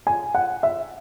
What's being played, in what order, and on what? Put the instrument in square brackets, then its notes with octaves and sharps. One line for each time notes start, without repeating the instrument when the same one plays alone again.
[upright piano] G#5
F#5
E5